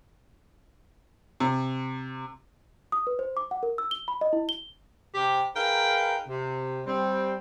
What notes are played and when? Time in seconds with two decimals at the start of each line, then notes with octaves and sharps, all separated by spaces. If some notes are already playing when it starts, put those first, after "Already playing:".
1.40 C3
2.92 D#6
3.07 B4
3.19 C5
3.37 D6
3.51 F#5
3.63 A#4
3.78 E6
3.91 G7
4.08 B5
4.21 D#5
4.33 E4
4.49 G7
5.15 C3 G4
5.55 D#4 G#4 A#4 B4 F5 G5
6.28 C3
6.87 G3 C4